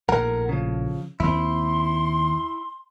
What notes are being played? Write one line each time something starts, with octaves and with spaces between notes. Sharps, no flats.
A#1 A2 A#4 F#5 A#5
C#3 F3
D#2 A3 C4 E4 C6